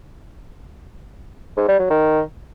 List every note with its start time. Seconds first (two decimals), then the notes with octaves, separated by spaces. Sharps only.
1.57 G#2
1.68 G3
1.79 F#3
1.91 D#3